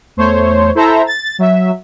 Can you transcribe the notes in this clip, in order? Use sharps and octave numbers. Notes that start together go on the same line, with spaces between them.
E2 A3 C5 C#5
E4 A4 C5 E5 A#5
A6
F#3 E5